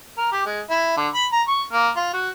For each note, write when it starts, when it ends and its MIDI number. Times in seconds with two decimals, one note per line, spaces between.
0.18 0.30 70
0.32 0.44 67
0.46 0.61 56
0.70 0.95 64
0.97 1.08 50
1.14 1.26 83
1.32 1.42 82
1.48 1.63 85
1.73 1.89 58
1.96 2.11 65
2.13 2.30 66